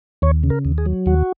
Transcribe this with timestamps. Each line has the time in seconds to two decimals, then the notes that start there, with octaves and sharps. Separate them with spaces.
0.22 D#2 C#5
0.43 C#3
0.50 A#4
0.65 D#2
0.78 G#4
0.86 F#3
1.06 D#2 F#4